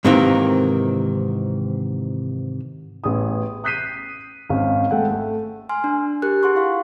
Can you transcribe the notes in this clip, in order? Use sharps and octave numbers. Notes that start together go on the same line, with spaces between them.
G#2 C3 D#3 E3 A#3 C4
A1 B3 G#4 D#6
D#6 F#6 G6 B6 C7 D#7
G#1 C#4 F5
G#3 A3 A4 F#5 G5
A3
G#5 C6 F6
D4
G4 A#4 F#6
G#4 F#5 C6 C#6
E4 F4 F5 C#6